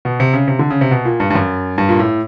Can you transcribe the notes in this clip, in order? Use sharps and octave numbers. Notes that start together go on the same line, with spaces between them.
B2
C3
C#3
C3
D3
C#3
C3
B2
A#2
G2
G2
F#2
G2
A#2
A2